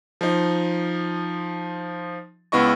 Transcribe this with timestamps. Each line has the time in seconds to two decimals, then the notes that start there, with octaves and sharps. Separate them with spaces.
0.21 F3 D#4
2.52 C#2 B3 E4 D#5 C#6